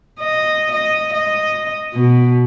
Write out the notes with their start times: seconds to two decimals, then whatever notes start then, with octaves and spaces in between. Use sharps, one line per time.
0.20 D#5
0.72 D#5
1.14 D#5
1.94 B2